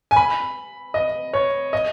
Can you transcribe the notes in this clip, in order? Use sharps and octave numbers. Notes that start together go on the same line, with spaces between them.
G#5
B5
D#5
C#5
D#5